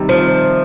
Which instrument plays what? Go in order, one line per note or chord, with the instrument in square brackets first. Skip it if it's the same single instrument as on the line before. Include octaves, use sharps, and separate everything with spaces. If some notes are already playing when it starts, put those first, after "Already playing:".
Already playing: [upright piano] C3 D#3 G3
[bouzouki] F3